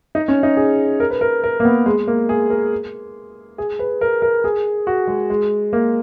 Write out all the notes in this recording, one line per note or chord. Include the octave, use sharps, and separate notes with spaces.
D#4
C#4
D#4
G#4
A#4
B4
A#4
A#4
A#3
B3
G#3
A#3
G#4
A#4
G#4
B4
A#4
A#4
G#4
F#4
G#3
G#3
A#3